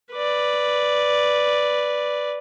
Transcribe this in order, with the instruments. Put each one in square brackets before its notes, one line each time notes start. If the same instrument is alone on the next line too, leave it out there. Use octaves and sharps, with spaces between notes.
[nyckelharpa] B4 D5